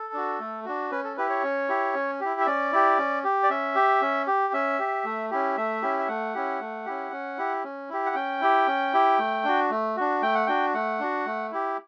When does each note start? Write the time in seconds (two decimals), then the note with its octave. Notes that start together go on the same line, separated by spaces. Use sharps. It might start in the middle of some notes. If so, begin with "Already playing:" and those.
Already playing: A4
0.13 D4 F#4
0.40 A3
0.65 D4 F#4
0.91 C#4 B4
1.04 A4
1.17 E4 G4 B4
1.30 C#5
1.43 C#4
1.69 E4 G4
1.95 C#4
2.20 E4 G4
2.40 E5
2.46 C#4 D5
2.72 E4 G4
2.98 C#4
3.24 G4
3.43 D5
3.50 C#4 E5
3.75 G4
4.01 C#4
4.27 G4
4.53 C#4 E5
4.79 G4
5.05 A3
5.31 C#4 E4 G4
5.57 A3 E5
5.82 C#4 E4 G4
5.99 E5
6.08 A3 F#5
6.34 C#4 E4 G4
6.60 A3
6.86 C#4 E4 G4
7.12 C#4
7.38 E4 G4
7.64 C#4
7.89 E4 G4
8.06 F#5
8.15 C#4 G5
8.41 E4 G4
8.67 C#4
8.93 E4 G4
9.19 A3
9.45 D4 F#4
9.70 A3
9.96 D4 F#4
10.22 A3 G5
10.35 F#5
10.47 D4 F#4 G5
10.74 A3 F#5
10.99 D4 F#4
11.26 A3
11.51 E4 G4